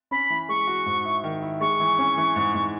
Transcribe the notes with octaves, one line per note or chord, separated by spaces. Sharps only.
C#4 B5
E3
G#3 C#6
F#4
G#2
E4
D#3
E4
G#3 C#6
E3
C#4
E3
G#2
G#2